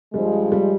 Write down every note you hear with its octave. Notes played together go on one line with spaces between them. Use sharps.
G2 F3 G3 G#3
G3